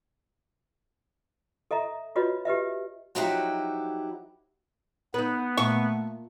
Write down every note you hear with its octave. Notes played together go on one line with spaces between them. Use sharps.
A4 D#5 E5 A#5
F4 F#4 B4 C#5 D#5
G4 B4 D#5 E5
F3 F#3 D#4 E4 F#4 G4
B3 D#4 B4
A#2 A3 C#6